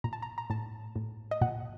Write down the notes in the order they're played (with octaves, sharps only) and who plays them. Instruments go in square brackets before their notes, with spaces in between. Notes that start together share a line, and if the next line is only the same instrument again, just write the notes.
[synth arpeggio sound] A#2 A#5
A5
A#5
A#5
A2 A5
A2
D#5
A#2 F#5